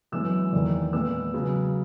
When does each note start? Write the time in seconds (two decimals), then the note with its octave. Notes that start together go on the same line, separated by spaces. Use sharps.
0.12 F#2 E3 G#3 B3 E6
0.52 E2 D#3 A#3
0.93 A#2 G#3 B3 E6
1.33 C#3 F#3 B3